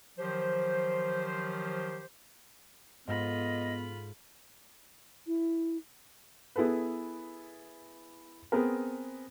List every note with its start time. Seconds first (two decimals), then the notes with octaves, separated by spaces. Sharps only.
0.18 D#3 F3 F#3 G4 C5
3.07 G#2 B3 F4 A4 D#5 B5
5.27 E4
6.56 B3 E4 G#4 A4 B4
8.52 B3 C4 G#4 A#4